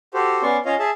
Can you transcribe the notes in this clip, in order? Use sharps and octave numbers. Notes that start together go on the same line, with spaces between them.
F#4 G4 A4 C5
B3 C#4 D5 C6 C#6
C#4 F4 C#5 D#5 F5
G#4 E5 A5